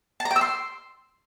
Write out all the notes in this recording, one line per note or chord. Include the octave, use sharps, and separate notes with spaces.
A5
A#5
G5
E6
C6